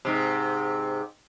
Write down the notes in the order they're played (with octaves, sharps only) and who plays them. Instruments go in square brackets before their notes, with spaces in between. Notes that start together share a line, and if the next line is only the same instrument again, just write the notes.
[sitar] G#2 C3